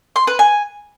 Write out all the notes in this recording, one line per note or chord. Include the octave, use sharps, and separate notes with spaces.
C6
B4
G#5